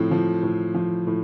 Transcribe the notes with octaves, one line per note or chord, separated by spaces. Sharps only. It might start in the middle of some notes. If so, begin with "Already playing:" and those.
Already playing: A2 F3 C4
F3
A2
F3
A2